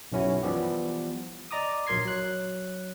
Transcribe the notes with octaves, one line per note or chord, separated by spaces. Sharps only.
B1 F#2 C#4 E4 F#4
E3 F3 G3 B3 G4
D5 D#5 A#5 D6 D#6
A#1 F#3 A#4 C6 G#6 C7
F#3 F#6